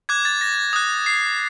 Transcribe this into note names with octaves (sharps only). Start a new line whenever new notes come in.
D6 F#6 G#6
A6
A#6
D#6 F#6
C7